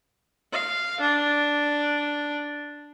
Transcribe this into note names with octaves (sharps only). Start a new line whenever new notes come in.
F5
D4